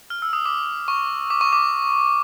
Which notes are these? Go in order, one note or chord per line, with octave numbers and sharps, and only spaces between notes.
F6
E6
D#6
D6
C#6
D6
C#6
D6